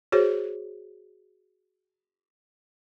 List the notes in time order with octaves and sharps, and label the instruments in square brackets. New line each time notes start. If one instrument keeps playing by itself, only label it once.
[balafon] F#4 G#4 C5 C#5